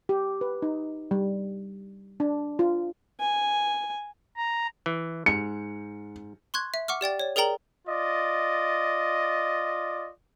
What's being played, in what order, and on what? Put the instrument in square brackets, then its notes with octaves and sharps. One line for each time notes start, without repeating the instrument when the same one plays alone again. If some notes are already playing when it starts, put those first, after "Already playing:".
[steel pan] G4
B4
D#4
G3
D4
F4
[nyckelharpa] G#5
[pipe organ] A#5
[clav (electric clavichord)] E3
[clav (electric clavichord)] G#2 [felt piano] C#7
[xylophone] C6 C#6 F#6 G#6
E5
F#5 C#6 D6 F6
G4 D5 G5 A6
C#5 D5
G#4 A#4 D5 G5 A#5 F#7
[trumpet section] F4 D5 D#5